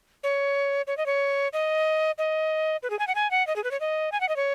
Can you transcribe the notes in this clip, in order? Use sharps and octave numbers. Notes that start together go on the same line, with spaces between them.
C#5
C#5
D#5
C#5
D#5
D#5
B4
G#4
G#5
F#5
G#5
F#5
D#5
G#4
B4
C#5
D#5
G#5
F#5
D#5
C#5